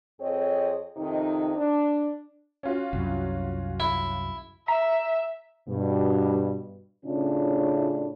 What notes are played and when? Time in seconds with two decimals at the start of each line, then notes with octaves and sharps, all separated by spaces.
0.21 F2 C4 G#4 C#5 D#5
0.97 F2 C3 D#3 D#4
1.56 D4
2.63 C#4 F4 F#4
2.93 C2 F#2
3.80 E4
4.68 E5 A#5 B6
5.68 G2 B2
7.05 A2 C#3 C#4 D4 E4 F4